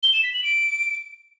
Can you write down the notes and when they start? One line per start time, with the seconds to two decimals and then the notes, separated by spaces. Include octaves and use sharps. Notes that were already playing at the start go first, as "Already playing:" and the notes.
0.03 G7
0.13 E7
0.23 B6
0.34 F#7
0.44 D7